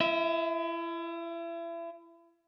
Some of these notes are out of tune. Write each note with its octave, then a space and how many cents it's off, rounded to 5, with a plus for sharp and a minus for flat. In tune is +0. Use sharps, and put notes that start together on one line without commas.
E4 +35 E5 -25